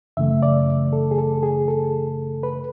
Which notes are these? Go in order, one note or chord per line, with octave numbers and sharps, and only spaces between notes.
F#2 C#3 E3 A3 E5
D5
A4
G#4
A4
G#4
A4
B4